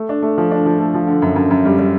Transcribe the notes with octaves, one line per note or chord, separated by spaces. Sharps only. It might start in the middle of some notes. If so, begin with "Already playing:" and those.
Already playing: A3
D4
A3
F3
D4
F3
A3
F3
D3
F#2
F#2
F#2
G3
G3